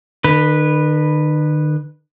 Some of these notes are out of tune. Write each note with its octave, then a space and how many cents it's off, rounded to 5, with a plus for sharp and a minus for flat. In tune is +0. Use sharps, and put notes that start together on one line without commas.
D#3 -45 B4 -5